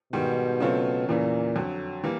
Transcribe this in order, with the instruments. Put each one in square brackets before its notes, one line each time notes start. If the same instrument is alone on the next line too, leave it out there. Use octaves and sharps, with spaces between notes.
[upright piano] G#2 D#3 G3 [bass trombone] B2
[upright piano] C#3 F#3 A3 C4 F4
[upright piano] E2 C#3 E3 [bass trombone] A#2
[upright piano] F2 D3 F#3
E3 G3 A#3